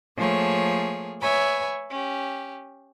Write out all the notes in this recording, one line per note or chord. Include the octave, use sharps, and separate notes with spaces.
F3 A3 A#3 G#4 C#5
B4 C#5 E5 G#5 B5
C#4 G4